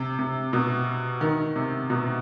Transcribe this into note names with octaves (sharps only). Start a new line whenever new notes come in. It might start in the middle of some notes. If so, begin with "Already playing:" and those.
Already playing: C3
C3
B2
D#3
C3
B2